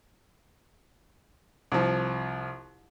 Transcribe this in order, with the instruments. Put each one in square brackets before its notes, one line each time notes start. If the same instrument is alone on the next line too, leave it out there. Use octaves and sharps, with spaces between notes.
[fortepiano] C2 F3